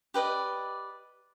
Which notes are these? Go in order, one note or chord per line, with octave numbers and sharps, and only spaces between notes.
G4 B4 D5 D#5